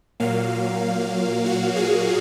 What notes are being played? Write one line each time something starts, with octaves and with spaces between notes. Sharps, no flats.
A#2 F#3 A#3 F5
F#4
G#4